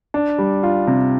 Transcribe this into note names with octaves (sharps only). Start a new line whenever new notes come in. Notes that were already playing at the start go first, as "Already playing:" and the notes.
D4
G3
F4
C3